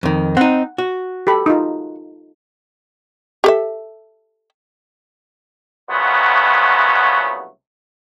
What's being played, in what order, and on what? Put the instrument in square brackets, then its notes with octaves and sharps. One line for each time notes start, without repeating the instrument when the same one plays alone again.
[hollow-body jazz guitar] F2 D#3
[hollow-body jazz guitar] C4 D#4 [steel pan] F#5
[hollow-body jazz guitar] F#4
[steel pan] G4 A4 B5
D#4 F4
[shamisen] G4 A4 E5
[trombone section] C2 A#2 C#3 F#3 A3 B3